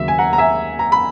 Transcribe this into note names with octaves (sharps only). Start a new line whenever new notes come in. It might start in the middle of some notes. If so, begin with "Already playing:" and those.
Already playing: D#2 C#3 F#3 A#3 E5
G#5
F#5 A#5
A#5
E5 G#5
A#5
B5